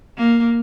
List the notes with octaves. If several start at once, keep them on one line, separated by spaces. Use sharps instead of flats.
A#3